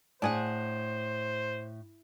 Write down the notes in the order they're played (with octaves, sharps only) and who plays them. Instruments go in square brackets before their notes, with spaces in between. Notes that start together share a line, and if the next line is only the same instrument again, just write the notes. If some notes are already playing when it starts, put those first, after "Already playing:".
[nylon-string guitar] A2 [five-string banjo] D4 G#4 F#5 [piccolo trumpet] C5